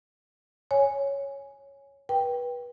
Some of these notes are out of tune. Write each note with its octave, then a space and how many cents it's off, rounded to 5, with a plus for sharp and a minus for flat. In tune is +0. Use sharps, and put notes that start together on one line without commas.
C#5 +0 G#5 +0
B4 -25 G5 +0